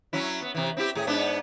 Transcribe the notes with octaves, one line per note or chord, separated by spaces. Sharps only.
F#3 C#4 E4
B3
C3 E3
C4 E4 G4
A2 G#4
G#2 B3 D4